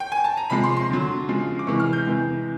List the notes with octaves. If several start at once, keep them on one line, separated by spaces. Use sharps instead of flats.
G5
G#5
A5
A#5
C3 F3 G#3 B5
C6
C6
D3 F#3
C#3 F3 G#3
D6
C3 E3 G#3 C#6
F6
G6
C3 E3 G#3